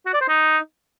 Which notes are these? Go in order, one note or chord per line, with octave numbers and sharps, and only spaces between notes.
F#4
D5
C5
D#4